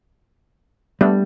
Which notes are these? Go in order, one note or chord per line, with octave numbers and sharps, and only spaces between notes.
G3 A3 B3 D4